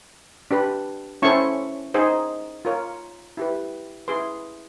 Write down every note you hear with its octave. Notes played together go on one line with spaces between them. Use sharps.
D4 G4 B4
C#4 E4 A4 C5 C#6
D#4 G#4 C5
F4 A#4 C#5
E4 G4 B4
E4 G#4 B4 C6